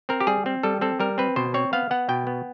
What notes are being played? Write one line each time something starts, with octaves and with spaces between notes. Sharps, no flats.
C4 A#4
G4
G3 G#4
C4
G3 A4
C4 A4
G3 A#4
C4 B4
B2 C5
C4 C#5
B3 F5
B3 F#5
B2 G5
B3